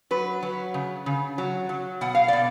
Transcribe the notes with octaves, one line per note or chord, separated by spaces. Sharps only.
F#3 B4
F#3
C#3
C#3
F#3
F#3
B2 F#5
F5
B2 D5